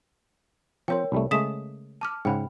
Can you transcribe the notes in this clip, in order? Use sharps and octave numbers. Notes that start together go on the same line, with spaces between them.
F3 C4 A#4 C5 C#5 G5
C2 G3 A3
C#3 G#3 A3 D#6 B6 E7
A5 D6 F6
G#2 C#3 F#5 G5 B5